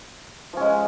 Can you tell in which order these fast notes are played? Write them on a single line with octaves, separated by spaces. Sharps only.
F3 C#4 G#3